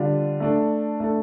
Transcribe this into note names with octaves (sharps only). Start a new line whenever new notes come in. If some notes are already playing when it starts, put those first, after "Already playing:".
Already playing: D3 G3 D4 F4
A3 D4 A4
A3 D4 A4